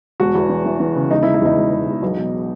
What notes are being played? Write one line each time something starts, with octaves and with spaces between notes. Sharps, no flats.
E1 F#4
E2
E3
E3
E3
C#3
E1 D#4
E4
E1
E4
E2 D#4
E1
E1
E1
B1
B2